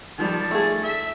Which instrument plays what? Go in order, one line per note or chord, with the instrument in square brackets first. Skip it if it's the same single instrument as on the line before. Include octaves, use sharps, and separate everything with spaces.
[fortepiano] D#3 F3 G3 [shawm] A5
[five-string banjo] A3 G#4
[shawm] E5